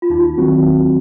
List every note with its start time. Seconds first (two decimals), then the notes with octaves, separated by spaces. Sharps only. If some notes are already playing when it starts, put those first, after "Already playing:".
0.02 F4
0.10 D#2 D#4
0.38 D#3 F#3 C4 F#4
0.64 D#2